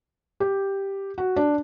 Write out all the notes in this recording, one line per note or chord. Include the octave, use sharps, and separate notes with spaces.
G4
F#4
D4